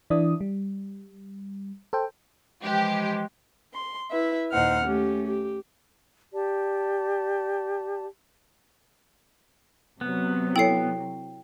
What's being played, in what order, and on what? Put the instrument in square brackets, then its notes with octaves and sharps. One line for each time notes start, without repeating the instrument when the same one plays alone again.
[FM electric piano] E3 D4 E4 D5 D#6
G3
A4 C5 G5
[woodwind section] E3 F3 G#3 [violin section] G4
[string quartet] C6
E4 B4 E5
D#2 A#2 D#4 C5 F#5 F6
A3 C#4 G4
G4
[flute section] G4 D5 A5
[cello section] C3 F#3 [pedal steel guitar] B3
[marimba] E4 A4 C#5 [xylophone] G5 C7